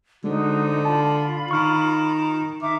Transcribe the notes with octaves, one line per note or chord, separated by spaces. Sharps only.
D3 G#3 D#4 F#4 C5
F4 A5 B5
D#3 C#6 F6
D#3 E5 D6